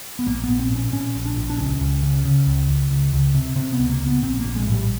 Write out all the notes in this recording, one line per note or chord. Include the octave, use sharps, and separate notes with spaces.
B3
A#1 A#3
A#1 B3
C4
A#2
C#4
A#2 C#4
A#1
D4
A#1
D4
C#2 C#4
C#2
C#3
C#3
C#2
C#2
C#2
C#2
C3
C3 C4
B3
C#2
A#3
C#2
B3
A#1 C4
A#1 A#3
G#3
A2
G3